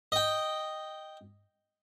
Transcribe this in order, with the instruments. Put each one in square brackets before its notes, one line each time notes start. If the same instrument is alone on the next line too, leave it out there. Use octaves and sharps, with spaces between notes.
[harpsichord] D#5 G5